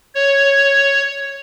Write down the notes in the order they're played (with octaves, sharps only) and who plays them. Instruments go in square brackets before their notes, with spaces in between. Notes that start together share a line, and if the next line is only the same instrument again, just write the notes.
[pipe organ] C#5